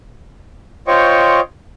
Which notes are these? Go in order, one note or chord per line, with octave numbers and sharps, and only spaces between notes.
F4 C5 C#5 D#5 G5 C#6